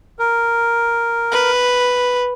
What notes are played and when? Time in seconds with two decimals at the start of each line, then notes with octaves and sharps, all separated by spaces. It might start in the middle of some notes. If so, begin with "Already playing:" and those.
0.19 A#4
1.32 B4